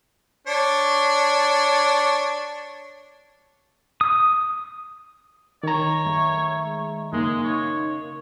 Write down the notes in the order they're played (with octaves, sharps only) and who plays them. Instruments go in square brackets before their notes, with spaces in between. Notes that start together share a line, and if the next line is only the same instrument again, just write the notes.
[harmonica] D4 C#5
[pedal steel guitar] D#6
[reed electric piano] D#3 A#5 [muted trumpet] C#5
[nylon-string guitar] A3
[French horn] G#3
[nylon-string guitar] C#3 A#3 [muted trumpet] G#3 [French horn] D#4
[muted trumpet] C#5